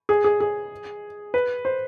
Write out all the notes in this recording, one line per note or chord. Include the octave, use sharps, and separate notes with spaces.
G#4
G#4
G#4
B4
C5